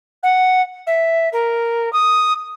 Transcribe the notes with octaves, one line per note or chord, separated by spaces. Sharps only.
F#5
E5
A#4
D#6